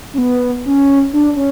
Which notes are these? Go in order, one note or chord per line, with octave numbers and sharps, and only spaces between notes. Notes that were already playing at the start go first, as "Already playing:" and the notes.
C#4
B3
C#4
D4
C#4